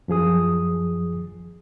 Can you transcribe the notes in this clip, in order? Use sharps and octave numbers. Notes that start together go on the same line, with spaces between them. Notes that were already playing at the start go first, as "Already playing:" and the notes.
F#2 F3 G#4 D#6